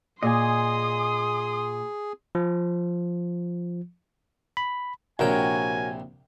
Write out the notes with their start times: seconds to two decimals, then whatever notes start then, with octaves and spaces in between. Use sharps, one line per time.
0.23 A#2 G#4 D#5 G#5 C6 D#6
2.35 F3
4.57 B5
5.19 A#1 C3 F#4 A#4 C#5 G5 G#5